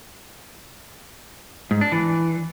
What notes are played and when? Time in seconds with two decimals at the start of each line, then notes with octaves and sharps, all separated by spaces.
1.71 G#2
1.81 D4
1.92 E3